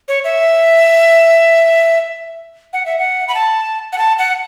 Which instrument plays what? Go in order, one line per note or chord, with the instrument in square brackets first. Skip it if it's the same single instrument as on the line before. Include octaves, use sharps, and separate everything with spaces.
[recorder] C#5
E5
F#5
E5
F#5
B5
A5
F#5
A5
F#5